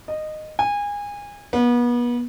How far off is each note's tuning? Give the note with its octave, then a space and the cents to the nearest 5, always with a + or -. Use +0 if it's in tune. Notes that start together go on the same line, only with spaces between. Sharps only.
D#5 -15
G#5 -25
B3 -35